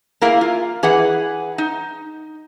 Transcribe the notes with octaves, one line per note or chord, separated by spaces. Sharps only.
A#3 E4 G#4 A#4 F5
F4
E3 G#4 B4 F#5
D#4